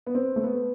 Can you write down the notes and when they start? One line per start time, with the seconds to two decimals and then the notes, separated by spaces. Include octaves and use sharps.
0.06 B3
0.15 C4
0.36 A3
0.44 B3